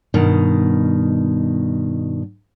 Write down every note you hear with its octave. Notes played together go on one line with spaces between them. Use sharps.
G2 B2 D#3